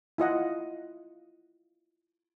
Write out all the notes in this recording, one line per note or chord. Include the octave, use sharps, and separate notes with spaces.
E4 F4 D#5 F#5